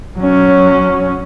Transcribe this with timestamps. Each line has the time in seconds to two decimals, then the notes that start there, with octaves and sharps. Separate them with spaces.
0.19 F#3 C#4